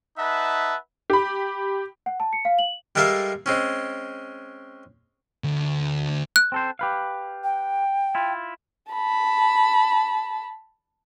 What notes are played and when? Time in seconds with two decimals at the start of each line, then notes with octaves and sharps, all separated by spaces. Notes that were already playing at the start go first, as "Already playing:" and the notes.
0.18 D#4 B4 E5 F#5 A5
1.10 G4 B5
2.06 F#5
2.20 A5
2.33 C#7
2.45 F5
2.59 F#7
2.95 G3 G#3 A4 A#4 E5 F5
3.46 G#3 C4 C#4
5.44 D2
6.36 F#6
6.52 C4 A4 C5
6.79 G4 B4 F5
7.44 G5
8.15 E4 F4
8.92 A5 B5